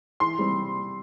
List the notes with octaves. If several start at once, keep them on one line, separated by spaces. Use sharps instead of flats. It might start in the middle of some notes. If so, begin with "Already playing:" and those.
E3 C6
G3 C4